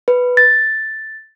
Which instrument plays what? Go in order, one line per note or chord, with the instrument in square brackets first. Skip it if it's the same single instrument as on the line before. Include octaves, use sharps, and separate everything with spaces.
[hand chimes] B4
A6